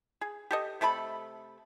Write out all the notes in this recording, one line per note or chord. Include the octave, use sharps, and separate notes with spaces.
G#4
G4 A4 D#5
C3 A3 A4 B5